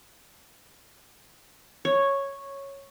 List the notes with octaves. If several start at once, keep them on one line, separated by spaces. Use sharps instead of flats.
C#5